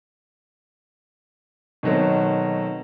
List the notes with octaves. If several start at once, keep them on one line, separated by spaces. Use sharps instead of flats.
B2 D#3 F#3 A3 C4